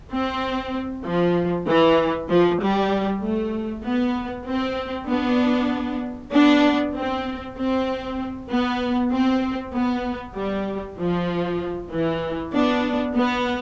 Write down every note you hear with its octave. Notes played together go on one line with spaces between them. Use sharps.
C4
F3
E3
F3
G3
A3
B3
C4
B3 D4
B3 D4
C4
C4
B3
C4
B3
G3
F3
E3
B3 D4
B3